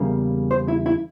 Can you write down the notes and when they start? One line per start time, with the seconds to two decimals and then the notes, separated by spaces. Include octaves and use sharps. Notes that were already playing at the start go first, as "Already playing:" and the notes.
Already playing: E2 C#3 G3 A#3
0.51 C5
0.68 E4
0.86 E4